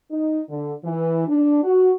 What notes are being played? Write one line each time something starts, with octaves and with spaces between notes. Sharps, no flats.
D#4
D3
E3
D4
F#4